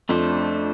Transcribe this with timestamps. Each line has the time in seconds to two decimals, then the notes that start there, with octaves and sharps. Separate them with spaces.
0.09 F2 A3 D4 A4 C5